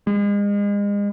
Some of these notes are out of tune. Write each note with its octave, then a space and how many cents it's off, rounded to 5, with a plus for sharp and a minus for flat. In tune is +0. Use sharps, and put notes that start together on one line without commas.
G#3 -35